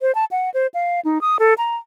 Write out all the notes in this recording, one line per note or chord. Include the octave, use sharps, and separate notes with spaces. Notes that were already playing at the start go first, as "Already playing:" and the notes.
C5
A5
F#5
C5
F5
D#4
D#6
A4
A#5